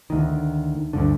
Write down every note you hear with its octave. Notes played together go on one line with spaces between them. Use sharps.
D2 D#3
D2 G2 D3